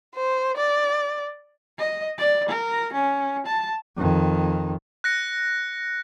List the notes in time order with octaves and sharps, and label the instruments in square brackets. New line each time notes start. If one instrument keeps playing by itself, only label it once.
[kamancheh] C5
D5
[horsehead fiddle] D#5
D5
A#4
C#4
A5
[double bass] F2 D#3
[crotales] F#6 A#6 C#7